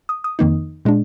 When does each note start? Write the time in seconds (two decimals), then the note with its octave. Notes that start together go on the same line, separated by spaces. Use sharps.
0.09 D#6
0.24 D#6
0.39 F2 D#3 A#3 D#4
0.85 A#2 G#3 D4